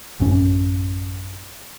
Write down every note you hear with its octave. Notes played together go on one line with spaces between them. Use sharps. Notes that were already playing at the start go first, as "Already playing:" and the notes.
A1 F#2 C#4